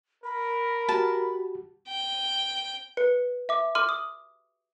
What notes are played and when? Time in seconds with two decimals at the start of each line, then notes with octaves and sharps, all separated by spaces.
0.24 A#4 B5
0.89 F#4 G4 A5
1.89 G5
2.97 B4 C#7
3.49 E5 D6
3.75 C6 D6 F6 D#7
3.89 D#6